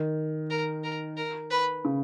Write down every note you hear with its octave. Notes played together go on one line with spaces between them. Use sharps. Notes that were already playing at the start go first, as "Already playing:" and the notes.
Already playing: D#3
A#4
A#4
A#4
B4
C#3